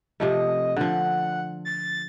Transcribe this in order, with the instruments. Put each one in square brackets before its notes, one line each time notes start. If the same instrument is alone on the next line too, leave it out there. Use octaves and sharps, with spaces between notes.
[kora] C3 F3 A3 [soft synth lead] D#5
[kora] D3 F3 [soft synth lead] F#5
[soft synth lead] A6